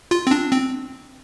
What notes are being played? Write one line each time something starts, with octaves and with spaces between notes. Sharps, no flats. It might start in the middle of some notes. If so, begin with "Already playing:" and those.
F4
C4
D4
C4